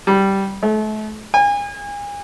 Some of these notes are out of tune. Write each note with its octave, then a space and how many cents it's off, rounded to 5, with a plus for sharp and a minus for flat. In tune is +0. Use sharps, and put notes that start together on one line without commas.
G3 -10
A3 -35
G#5 -35